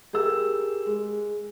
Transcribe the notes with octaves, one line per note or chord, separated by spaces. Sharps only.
G4 G#4 A#4 E6
G#3